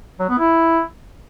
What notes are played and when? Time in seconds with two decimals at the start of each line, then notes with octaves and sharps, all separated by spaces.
0.19 F#3
0.29 B3
0.39 E4